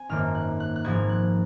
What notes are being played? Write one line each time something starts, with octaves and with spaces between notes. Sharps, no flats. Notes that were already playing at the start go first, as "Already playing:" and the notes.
Already playing: C4 G#5
G#1 F#2 D#3 A#3 F4 F6
F#6
F#6
F#6
G#1 G#2 F3 A#3 G#6
F#6